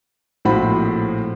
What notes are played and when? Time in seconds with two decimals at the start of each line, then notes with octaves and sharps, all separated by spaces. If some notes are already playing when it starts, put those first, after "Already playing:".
0.45 A#1 A2 F3 C4 F#4 B5